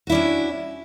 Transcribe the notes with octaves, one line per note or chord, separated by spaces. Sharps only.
C#4 D4 E4 F#4